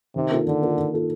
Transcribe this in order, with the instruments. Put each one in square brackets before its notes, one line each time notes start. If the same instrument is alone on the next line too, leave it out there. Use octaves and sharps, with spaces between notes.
[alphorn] C3 [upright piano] D#3
[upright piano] A#3 F4 A4
[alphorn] D3 [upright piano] D#3
[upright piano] A#3 F4 A4
D#3
A#3 F4 A4